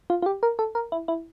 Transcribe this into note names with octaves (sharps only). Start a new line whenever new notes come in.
F4
F4
G4
A#4
A4
A#4
E4
E4